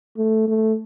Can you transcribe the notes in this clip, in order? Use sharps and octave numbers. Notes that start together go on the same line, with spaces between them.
A3
A3